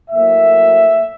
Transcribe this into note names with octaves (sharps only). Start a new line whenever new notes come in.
A2 F#3 A#3 E5